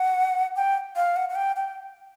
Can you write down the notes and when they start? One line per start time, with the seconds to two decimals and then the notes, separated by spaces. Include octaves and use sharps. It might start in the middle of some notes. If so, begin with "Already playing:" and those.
Already playing: F#5
0.56 G5
0.96 F5
1.16 F#5
1.30 F#5
1.35 G5
1.56 G5